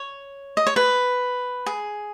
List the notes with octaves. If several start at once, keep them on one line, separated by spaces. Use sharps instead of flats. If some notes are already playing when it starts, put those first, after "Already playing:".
Already playing: C#5
D#5
C#5
B4
G#4